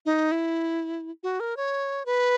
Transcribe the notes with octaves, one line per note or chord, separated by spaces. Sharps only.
D#4
E4
F#4
A#4
C#5
B4